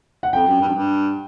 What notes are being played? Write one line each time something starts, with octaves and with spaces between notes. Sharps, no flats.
F#5
F2 G5
F#2
G2
F#2
G2